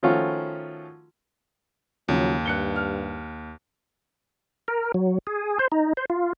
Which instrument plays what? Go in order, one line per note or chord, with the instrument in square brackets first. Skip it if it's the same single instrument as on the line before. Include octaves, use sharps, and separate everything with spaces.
[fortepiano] D#3 F3 A3 C#4 F4 F#4
[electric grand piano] D#2 [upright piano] C#3 F3 [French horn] F#3
[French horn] G2 [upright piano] F#6 C#7 G7
[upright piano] F6
[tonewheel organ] A#4
F#3
G#4
C5
D#4
C5
F4